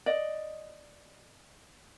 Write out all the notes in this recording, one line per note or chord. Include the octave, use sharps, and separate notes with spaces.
D5 D#5